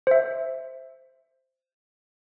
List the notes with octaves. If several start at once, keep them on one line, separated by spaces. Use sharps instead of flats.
C5 E5